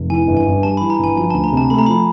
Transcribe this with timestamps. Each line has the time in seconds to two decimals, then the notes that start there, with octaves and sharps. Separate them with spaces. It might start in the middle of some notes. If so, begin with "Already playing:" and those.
Already playing: F1
0.10 E3 G#5
0.27 G1
0.37 G#5
0.46 G2
0.63 G3 A5
0.77 B5
0.81 E3
0.90 A#5
0.99 G1
1.04 G#5
1.16 F3 G#5
1.30 A5
1.34 D2
1.44 A#5
1.53 C3 A5
1.70 A3 B5
1.79 A#5
1.86 F3 B5